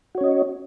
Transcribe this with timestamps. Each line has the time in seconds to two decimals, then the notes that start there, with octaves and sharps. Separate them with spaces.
0.15 F#4
0.18 C#5
0.21 C#4
0.24 D#5